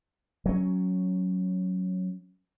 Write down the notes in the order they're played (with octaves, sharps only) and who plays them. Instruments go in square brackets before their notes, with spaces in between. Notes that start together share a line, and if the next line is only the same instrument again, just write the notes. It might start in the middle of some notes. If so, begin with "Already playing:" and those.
[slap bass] F#3 C#4